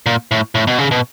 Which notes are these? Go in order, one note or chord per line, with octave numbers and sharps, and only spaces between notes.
A#2
A2
A2
B2
C#3
B2